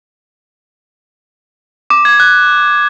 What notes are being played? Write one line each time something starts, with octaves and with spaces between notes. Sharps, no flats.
D6
G#6
F#6